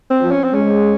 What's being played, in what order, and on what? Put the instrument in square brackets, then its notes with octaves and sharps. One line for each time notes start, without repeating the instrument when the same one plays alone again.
[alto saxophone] C4
[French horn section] F3
[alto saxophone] C#4
C4
[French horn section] G#3 [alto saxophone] C#4